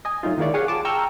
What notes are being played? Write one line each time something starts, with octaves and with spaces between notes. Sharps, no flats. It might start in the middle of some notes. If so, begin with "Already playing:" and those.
D#5 G#5
F#3 A3 D#4 F4
D#3 G#3 A#3 E4 C#5 D5
G4 G#4 C#5 F5 F#5 G#5
F4 A5 D6
G5 A#5 C#6 E6 F6 G6